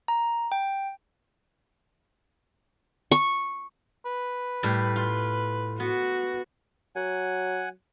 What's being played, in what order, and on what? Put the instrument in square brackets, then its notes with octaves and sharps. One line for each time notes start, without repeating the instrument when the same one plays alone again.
[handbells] A#5
G5
[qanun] C#6
[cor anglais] B4
[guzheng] A2 G3
F4
[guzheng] B3 [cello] F#4
[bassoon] F#3 [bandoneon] F#5 G#5